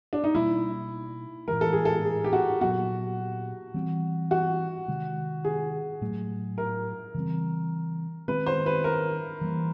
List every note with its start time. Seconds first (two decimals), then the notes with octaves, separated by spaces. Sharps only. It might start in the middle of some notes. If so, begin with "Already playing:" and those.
0.13 D4
0.24 D#4
0.35 B2 G3 A#3 E4
1.48 A2 E3 G#3 A#4
1.61 A4
1.73 G#4
1.85 A4
2.05 G#4
2.24 G4
2.33 F#4
2.61 A#2 F#3 B3 F#4
3.74 E3 G3 C4
4.31 F#4
4.88 C3 D#3 G#3
5.45 G#4
6.01 A2 F#3 A3
6.58 A#4
7.15 C#3 E3 G3 C4
8.28 D#3 G#3 C4 B4
8.46 C5
8.66 B4
8.84 A#4
9.41 E3 G3 A#3